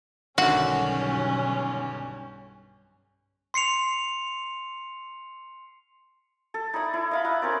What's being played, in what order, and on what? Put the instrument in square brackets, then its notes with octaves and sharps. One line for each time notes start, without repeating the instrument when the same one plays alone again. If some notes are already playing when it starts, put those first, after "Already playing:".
[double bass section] B1 G2 [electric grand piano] D3 D#3 [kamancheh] C#4 [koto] F#4
[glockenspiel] C6 C7 C#7 F7
[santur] A4
D#4 E4 D5 D#6
E4
D#5 F5 B5
E5 F#5 A#5 D#6
C#4 A#4 C5 D5